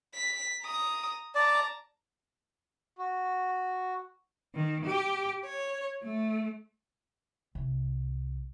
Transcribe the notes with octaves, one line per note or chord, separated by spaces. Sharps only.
B6
A#5 D#6
D5 A5 A#5
F#4
D#3
G4
C#5
A3
C2